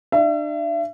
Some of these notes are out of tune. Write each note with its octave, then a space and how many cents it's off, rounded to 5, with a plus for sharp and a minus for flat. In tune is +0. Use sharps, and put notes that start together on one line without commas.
D4 +35 E5 +40